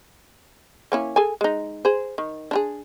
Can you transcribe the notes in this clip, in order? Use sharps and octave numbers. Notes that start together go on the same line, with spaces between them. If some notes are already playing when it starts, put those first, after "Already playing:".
A#3 C#4 E4
G#4 A4 G#5
G#3 D#4
G#4 C5
D#3
D4 F4 G#4